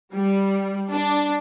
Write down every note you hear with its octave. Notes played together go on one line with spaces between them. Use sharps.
G3
D4